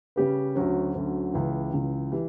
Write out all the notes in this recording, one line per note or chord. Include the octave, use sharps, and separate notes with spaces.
C#3 G3 C#4 G4 B4
D2 D3 F#3 C#4
D2 D3 F#3 C#4
C#2 C#3 E3
C#2 C#3 E3
E3 G3